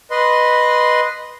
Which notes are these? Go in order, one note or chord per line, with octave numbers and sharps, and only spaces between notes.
B4 D#5 C6